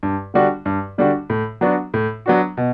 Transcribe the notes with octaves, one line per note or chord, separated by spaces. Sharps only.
G2
D3 G3 D4 F#4
G2
D3 G3 D4 F#4
A2
F#3 B3 D4 F#4
A2
F#3 B3 D4 F#4
B2